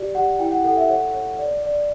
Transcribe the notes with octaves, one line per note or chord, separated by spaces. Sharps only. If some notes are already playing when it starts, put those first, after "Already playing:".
Already playing: G4 D5
G4 F#5
E4 G5
F#5
A4 F#5
E5
C#5 F#5
C#5
D5
D5